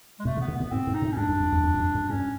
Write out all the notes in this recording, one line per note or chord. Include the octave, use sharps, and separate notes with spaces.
G#3
B2 A3
C3
B3
B2
A#2 B3
G#2 C4
G#2
D#4
A2
C#4
G2 D4
F#2
F2
E2
E2
F#2
F2
F#2
G2 C#4